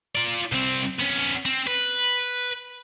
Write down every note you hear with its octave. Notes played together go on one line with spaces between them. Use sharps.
F4 D5
C2 C4
B3 C#4
C4
B4